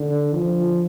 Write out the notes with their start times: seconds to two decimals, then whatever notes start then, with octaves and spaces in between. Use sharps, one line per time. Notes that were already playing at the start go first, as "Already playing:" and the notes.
Already playing: D3
0.34 F3